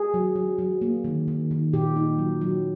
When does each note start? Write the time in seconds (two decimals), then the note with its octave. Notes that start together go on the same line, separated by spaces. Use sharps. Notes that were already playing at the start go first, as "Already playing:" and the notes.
Already playing: G#4
0.14 F#3
0.36 F#3
0.58 F#3
0.81 A#3
1.04 D#3
1.28 D#3
1.51 D#3
1.73 A#2 G4
1.96 D#4
2.19 F#3
2.41 F#3